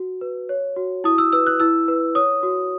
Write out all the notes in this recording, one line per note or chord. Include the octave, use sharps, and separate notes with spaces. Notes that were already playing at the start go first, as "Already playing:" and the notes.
Already playing: F#4
B4
C#5
F#4
E4 D#6
E6
B4 E6
F#6
E4 E6
B4
C#5 D#6
F#4